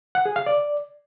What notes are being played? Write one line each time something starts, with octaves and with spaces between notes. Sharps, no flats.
F#5
G#4
F5
D5